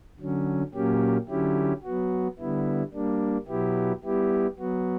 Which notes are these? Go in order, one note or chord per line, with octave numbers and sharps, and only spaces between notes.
D3 F#3 C#4
A#2 F#3 A#3 C#4 G4
D3 F#3 C#4 E4 G4
F#3 B3 F#4
D3 G3 B3 E4
G3 A#3 D4
B2 F#3 B3 E4 G4
G3 B3 E4 G4
F#3 B3 F#4